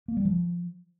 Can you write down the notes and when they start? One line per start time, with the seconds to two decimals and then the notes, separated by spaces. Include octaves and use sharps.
0.08 A#3
0.17 G3
0.25 F3